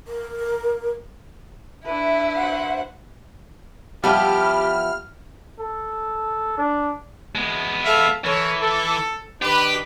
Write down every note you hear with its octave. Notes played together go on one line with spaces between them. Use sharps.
A#4
D4 E4 B4 E5
F#4 C5 F#5
F3 G3 B3 E4 G4 F6
A4
D4
G#3 B3
A4 E5 F5
E3 A4 A#4 C#5
A4
D#3 D4 G4 B4